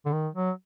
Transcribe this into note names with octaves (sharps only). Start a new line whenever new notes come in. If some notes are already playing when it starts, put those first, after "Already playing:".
D3
D#3
F#3